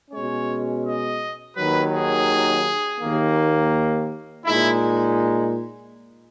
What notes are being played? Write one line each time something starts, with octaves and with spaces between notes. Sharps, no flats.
B2 G#3 C#4 C#5
D#5
D#2 D#3 F#3 B4
G#4
D#2 D#3 A#3
A#2 G#3 D#4 E4